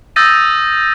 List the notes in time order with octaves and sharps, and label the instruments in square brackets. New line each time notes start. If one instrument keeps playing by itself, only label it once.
[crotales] D#6 E6 G6 A6 A#6 D#7